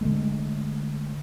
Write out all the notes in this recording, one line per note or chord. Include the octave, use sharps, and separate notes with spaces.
D3 G#3 A3